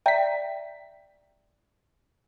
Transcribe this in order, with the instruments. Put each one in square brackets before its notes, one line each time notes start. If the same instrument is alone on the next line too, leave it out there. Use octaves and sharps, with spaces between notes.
[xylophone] D5 E5 A#5 [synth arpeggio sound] G5 B6